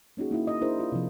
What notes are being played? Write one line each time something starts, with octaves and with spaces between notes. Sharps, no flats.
A#3 C#4 D#4 F#4 G#4
A#3 D#4 E4
D#5
D4 E4 G#4 A#4 C5
F4
C3 F3